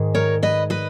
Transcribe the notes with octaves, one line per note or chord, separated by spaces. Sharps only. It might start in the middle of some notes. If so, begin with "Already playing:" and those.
Already playing: G#2 D#3 G#3
A#4 C#5
B4 D#5
B4 D#5